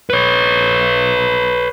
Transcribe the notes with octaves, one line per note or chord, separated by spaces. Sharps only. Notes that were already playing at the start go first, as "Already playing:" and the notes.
B4 C#5